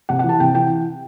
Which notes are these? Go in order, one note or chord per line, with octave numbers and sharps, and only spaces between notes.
C3 F#5
F#5
E3
A5
C3 G5
E3 G5